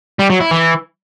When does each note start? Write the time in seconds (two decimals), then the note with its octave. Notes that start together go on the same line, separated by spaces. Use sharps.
0.19 G3
0.30 F#3
0.40 E4
0.51 E3